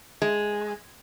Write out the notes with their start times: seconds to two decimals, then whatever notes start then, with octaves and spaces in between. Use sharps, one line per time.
0.22 G#3